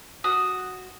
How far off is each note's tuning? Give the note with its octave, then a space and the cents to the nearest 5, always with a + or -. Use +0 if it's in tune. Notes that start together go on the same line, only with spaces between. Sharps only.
F#4 +0 D#6 +0